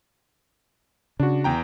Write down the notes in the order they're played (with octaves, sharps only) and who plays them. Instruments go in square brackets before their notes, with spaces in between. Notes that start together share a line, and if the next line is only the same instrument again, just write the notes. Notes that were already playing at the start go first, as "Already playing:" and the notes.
[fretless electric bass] C#3 [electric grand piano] D4 F#4
[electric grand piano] E2 G5 A#5